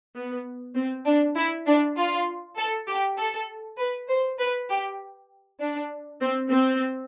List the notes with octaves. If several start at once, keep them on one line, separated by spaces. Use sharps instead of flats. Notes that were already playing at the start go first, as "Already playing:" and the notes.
B3
C4
D4
E4
D4
F4
A4
G4
A4
B4
C5
B4
G4
D4
C4
C4